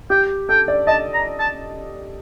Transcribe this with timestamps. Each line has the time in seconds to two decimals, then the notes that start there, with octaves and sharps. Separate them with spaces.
0.10 G4 G5
0.49 A4 G5
0.68 D5
0.87 D#5 A5
1.14 A#5
1.40 A5